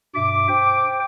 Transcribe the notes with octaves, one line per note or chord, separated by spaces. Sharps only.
G2 B2 E5 D6
C5 G5